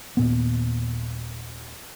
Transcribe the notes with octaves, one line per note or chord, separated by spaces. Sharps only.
D#1 A#2 B3